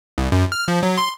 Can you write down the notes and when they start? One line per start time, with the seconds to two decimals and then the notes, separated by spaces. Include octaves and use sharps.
0.18 C2
0.32 F#2
0.52 F6
0.68 F3
0.83 F#3
0.98 C6